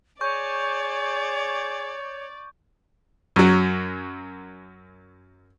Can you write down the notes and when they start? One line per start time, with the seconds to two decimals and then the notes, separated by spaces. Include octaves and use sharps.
0.21 G#4 C#5 D5 C#6 G6
3.36 F#2 F#3